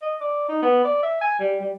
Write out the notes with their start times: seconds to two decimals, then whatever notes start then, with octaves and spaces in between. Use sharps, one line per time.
0.02 D#5
0.20 D5
0.49 D#4
0.62 B3
0.84 D5
1.03 E5
1.21 G#5
1.40 G3
1.61 G3